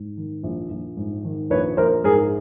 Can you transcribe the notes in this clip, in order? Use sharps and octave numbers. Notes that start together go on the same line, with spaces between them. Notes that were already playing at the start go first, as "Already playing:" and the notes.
Already playing: G#2
D#3
A#1
A#1
G#2
D#3
A#1 B4 C#5
A#1 A#4 C5
G#2 G#4 A#4